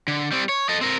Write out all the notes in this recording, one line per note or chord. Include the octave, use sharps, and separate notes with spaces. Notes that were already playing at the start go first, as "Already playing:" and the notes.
D3
G3 C4
C#5
A4 D#5
C4 A#4